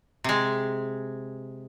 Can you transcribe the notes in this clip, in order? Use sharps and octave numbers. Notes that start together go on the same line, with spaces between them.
C3 G#3